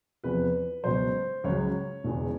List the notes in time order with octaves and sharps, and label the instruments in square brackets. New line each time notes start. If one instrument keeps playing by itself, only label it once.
[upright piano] E2 C3 F3 B4
C#2 B2 F#3 C5
C#2 C#3 F#3 C#5
E1 E2 C#3 E3